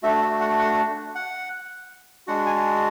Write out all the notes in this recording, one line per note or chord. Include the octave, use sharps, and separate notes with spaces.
A3 D4 F#4 E5
E5
F#5
F#5
F#5
G#3 D4 F#4 F#5
G#5